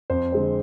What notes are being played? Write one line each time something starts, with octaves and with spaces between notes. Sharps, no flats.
F2 C5
D3 G#3 C4